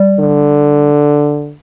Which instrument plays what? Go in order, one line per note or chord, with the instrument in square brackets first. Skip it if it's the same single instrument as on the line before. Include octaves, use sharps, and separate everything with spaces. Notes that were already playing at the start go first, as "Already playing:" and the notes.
Already playing: [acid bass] G3
[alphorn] D3